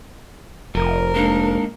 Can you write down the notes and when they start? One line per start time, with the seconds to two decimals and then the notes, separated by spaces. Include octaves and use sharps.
0.75 F1 F3 A#4
1.15 G#3 A#3 D4 D#4